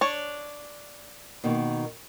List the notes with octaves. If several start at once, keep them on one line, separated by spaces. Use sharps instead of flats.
D4 C#5
B2 D#3 A#3